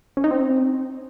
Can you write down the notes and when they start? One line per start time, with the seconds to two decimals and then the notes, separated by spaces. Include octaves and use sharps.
0.17 C#4
0.24 D#4
0.31 C4